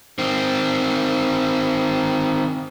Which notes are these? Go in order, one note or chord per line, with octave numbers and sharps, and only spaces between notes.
D#3 C4